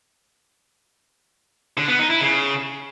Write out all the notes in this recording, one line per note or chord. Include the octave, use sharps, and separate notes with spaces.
D3
B3
D#4
E4
C#3